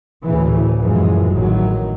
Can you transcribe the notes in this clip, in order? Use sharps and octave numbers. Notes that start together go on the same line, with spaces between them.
D2 A2 C#3 E3
F#2 A#2 E3 F3 G#3
A1 A2 D#3 F#3